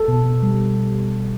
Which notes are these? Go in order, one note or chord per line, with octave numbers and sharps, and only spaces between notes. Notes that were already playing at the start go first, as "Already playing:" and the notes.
Already playing: A4
B2
B2
G3